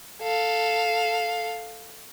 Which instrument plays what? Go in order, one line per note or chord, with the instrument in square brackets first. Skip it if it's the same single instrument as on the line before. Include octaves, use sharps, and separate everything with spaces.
[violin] A4 F5